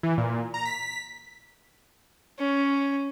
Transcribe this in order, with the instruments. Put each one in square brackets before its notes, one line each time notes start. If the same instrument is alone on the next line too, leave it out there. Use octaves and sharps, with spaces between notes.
[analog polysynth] E3
A#2
A#5
B6
[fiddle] C#4